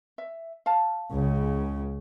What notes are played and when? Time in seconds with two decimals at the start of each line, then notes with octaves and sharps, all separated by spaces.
0.18 E5
0.66 F5 A5
1.12 C#2 C#3